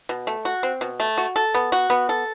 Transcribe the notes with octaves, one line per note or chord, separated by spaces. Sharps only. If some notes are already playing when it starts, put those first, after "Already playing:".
B2
A3
F#4
C4
B2
A3
F#4
A4
B3
F#4
B3
A4